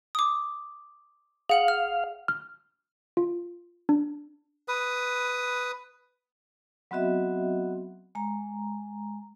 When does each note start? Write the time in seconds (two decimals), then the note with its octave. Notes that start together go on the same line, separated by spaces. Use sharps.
0.15 D6 D#6
1.49 G#4 F5 F#5 F#7
1.68 F6
2.28 F6
3.17 F4
3.89 D4
4.68 B4 D#6
6.91 F#3 B3 C4 F#4 D#5 E5
8.15 G#3 A#5